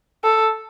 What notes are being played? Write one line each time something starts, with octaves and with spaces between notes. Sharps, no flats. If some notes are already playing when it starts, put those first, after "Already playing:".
A4